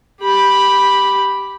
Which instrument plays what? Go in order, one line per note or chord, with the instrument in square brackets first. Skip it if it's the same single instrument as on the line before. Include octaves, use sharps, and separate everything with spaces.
[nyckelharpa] G4 B5